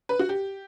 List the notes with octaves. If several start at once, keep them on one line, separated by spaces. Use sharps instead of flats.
B4
F#4
G4